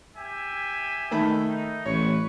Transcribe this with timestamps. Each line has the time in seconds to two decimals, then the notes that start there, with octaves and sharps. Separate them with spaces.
0.16 G4 E5 G#5
1.11 D#3 A3 B5
1.48 D#4
1.86 A1 B4 C#5 C#6